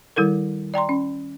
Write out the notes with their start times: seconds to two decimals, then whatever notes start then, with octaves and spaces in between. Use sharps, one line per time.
0.16 D#3 G3 E4 A4 A#4
0.74 D5 G5 A#5 C6
0.89 C#4